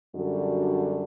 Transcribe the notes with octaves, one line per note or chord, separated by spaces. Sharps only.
F#2 D3 G3 D4 F#4